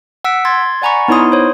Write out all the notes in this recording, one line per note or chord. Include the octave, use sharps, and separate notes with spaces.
F#5 E6 B6 D7
C6 G#6 A6
D5 F#5 G#5 A#5 B5 C#6
B3 D#4 E4 C#5 C6 D#6
C5 C#5